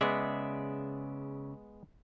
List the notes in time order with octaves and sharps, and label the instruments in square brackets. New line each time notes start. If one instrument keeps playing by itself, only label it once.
[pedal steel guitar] C#3 D5 E5 [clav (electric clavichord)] G#3 B3